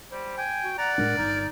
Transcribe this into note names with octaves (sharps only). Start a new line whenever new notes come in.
G3 C5
G5 G#5
F#4
D5 F#5 A#5
A2 G#3 D4 A#4
G1 D#4 A#4